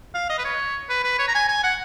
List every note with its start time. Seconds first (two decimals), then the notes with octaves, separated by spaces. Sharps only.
0.14 F5
0.29 D#5
0.38 B4
0.44 C#5
0.89 B4
1.04 B4
1.19 C#5
1.28 A#5
1.34 G#5
1.48 G#5
1.63 F#5